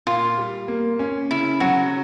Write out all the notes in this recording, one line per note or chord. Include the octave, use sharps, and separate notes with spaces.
A#2 F4
G3
A#3
C#4
C#3 E4
F#3 F#4